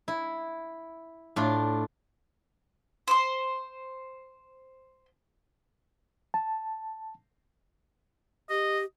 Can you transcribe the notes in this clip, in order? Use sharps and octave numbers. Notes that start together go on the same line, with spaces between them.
E4
A2 D4 F4
C5 C6
A5
G4 D#5